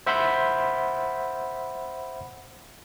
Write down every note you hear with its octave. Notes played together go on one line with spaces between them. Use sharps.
C5 E5 F#5 B5 C6 G6